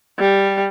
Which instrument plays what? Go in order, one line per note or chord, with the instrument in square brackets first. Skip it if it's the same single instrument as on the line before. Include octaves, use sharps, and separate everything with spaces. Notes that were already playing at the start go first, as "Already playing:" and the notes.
[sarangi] G3